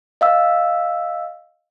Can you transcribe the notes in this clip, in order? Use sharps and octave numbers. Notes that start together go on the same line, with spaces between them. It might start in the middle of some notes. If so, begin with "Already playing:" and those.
D#5 F5 E6